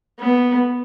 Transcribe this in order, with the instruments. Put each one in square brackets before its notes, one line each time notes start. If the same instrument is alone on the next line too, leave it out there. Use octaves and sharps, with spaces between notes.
[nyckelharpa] B3